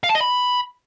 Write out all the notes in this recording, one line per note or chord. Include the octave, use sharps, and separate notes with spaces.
F5
A5
D#5
B5